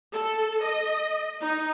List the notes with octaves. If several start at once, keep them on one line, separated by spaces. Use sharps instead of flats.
A4
D#5
D#4